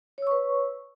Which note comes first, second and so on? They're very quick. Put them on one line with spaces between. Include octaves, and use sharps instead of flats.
C#5 E6 C#6 B4